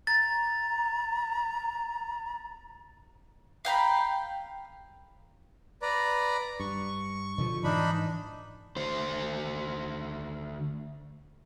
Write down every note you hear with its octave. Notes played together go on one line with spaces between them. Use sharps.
A#5 A6
F5 G5 A#5 B5
B4 D5 A#5
G2 C#6
B2 D3 F3
G#2 E3 D4 D#4 B5
D2 C5